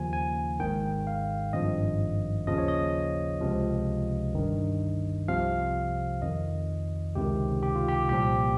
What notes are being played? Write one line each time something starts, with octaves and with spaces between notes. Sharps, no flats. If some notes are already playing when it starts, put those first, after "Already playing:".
Already playing: D#2 C#3 F3 G#5
G#5
G#1 G#2 D#3 G5
F5
G#1 G2 F3 D#5
D#2 C#3 F3 D#5
C#5
D#5
C#2 C3 F3
G1 G2 D#3
C2 C3 F3 F5
F2 D#3 D#5
C#2 C3 D#3 G4
G4
F4
G4
C2 A#2 F3 G4